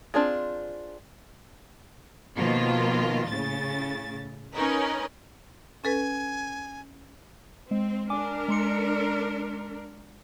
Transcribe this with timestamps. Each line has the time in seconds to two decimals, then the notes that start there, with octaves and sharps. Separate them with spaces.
0.14 C4 D4 F4 G#4
2.37 B2 D#3 F3 A#3 F4
3.29 A2 C#3 A6
4.53 C#4 D#4 A#4 B4
5.84 C#4 A4 B4 G#5
7.71 G#3 C4
8.10 D4 A#4 G#5 D6
8.48 G#3 C6 C#7